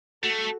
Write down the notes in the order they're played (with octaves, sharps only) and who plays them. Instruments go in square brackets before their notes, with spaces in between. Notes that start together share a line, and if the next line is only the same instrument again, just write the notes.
[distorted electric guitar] A3 [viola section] F#4 A4